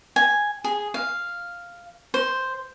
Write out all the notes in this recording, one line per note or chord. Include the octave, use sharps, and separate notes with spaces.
G#5
G#4
F5
C5